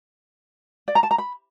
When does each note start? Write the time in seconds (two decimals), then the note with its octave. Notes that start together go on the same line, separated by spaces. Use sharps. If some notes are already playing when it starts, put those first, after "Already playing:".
0.88 D5
0.95 A#5
1.03 A5
1.11 A#5
1.18 B5